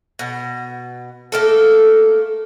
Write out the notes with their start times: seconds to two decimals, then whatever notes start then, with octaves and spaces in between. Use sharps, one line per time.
0.19 B2
1.32 A3 A#3 A4